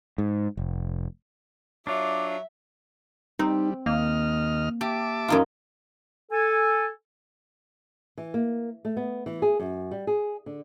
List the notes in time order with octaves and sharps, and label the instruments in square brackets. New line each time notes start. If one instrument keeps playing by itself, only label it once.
[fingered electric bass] G#2
F1
[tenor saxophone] F#3 [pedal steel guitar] D4 F4 [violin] E5 [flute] D6
[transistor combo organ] G3 [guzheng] C4 [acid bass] D#4
[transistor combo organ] D#2 D#5 F6 [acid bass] A#3
[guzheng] G4 [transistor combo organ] E5 A5 D6
[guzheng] F#2 D#4 F4
[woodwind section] A4 G#5
[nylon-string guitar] E3
A#3
A3
B3
E3
G#4
F#2
G3
G#4
D3